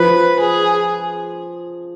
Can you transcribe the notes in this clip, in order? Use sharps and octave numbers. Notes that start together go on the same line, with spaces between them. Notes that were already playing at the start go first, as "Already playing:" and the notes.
Already playing: F3 B4
G#4